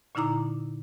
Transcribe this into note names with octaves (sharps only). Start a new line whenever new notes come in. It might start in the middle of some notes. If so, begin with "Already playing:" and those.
A#2 D3 D#4 E4 A#5 D6